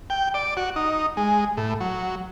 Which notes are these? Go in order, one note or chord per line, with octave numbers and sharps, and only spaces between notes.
G5
D5
F#4
D#4
G#3
A2
F#3